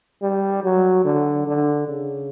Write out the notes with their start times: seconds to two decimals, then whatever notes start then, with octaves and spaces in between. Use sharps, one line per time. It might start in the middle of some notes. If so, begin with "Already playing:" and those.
0.22 G3
0.63 F#3
1.05 D3
1.47 D3
1.88 C#3